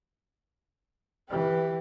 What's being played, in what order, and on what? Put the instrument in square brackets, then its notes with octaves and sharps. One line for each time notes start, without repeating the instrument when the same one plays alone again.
[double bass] E3 [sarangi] G4